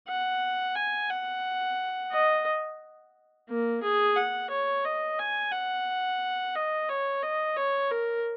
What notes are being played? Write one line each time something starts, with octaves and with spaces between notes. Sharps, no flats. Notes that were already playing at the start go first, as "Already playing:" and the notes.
F#5
G#5
F#5
D#5
A#3
G#4
F#5
C#5
D#5
G#5
F#5
D#5
C#5
D#5
C#5
A#4